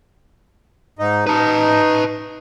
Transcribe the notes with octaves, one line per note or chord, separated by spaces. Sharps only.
G#2 D#4
D#4 B4 A5